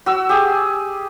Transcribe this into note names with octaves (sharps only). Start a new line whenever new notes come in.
F#4 E6
G4 G#4